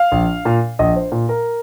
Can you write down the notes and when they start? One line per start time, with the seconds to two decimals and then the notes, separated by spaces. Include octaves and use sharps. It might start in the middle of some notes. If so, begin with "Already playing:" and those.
Already playing: F5
0.12 A#1
0.45 A#2
0.79 A#1 D#5
0.96 C5
1.12 A#2
1.29 A#4